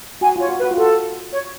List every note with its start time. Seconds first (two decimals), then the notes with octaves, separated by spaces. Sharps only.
0.21 F#4 G#5
0.36 F4 C#5
0.49 F#4
0.59 B4
0.63 F#4
0.71 F4
0.77 F#4 A4
1.32 C#5